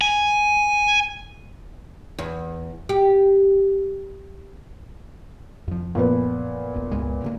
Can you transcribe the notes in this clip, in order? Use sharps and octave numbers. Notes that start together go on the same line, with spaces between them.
G#5
E2
G4
F2 F3
F#2 A#2 F3 B3 B4
E1 A#1
C#2 G2 G#3
D1 D2 A#3